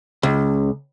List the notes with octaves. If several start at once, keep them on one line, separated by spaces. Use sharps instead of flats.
C#2